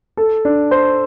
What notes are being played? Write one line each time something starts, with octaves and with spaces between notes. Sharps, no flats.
A4
D4
C5